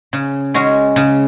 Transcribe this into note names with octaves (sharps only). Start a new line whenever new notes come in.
C#3
G#3 C#4 F#4
C#3